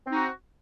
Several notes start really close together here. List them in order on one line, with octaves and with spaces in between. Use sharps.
C4 D#4 F#4